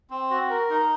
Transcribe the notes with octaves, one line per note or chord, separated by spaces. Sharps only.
C4
F#4
A#4
D#4